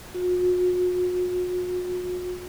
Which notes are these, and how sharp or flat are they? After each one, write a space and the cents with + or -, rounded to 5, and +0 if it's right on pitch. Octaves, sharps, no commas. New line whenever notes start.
F#4 -40